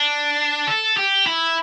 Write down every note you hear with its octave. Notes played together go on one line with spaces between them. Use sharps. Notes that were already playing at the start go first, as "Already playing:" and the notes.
Already playing: D4
A4
G4
E4